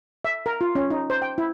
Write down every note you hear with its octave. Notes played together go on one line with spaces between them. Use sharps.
E5
A#4
F4
C#4
D#4
C5
G5
E4